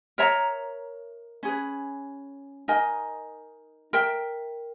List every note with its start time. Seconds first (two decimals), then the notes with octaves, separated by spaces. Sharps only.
0.18 A#4 C#5 E5 A#5
1.43 C#4 G#4 B4
2.68 D#4 A#4 D#5 G#5
3.93 A#4 E5 G5